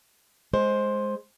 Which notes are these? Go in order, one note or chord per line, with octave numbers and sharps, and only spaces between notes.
G#3 C5